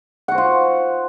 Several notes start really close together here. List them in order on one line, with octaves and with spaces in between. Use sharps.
F#5 F#4 C5 F4